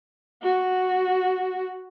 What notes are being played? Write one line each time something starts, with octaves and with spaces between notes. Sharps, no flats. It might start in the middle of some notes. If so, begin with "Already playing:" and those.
F#4